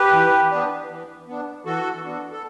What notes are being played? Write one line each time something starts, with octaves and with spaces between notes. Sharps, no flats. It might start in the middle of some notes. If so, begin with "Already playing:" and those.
Already playing: G4 B4
E3
B3 D4
E3
B3 D4
E3 F#4 A4
B3 D4
A4